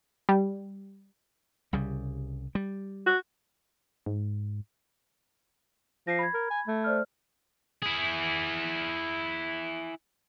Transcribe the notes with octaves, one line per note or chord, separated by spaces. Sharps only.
G3
C2 C#3 G3
G3
F#4
G#2
F3 A#6 C7
B5 G#6
A#4
G#5
A3
C5 D5 F6
E4 G#4